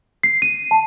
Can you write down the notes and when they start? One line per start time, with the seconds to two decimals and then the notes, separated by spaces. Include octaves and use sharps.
0.23 C7
0.42 D#7
0.71 A5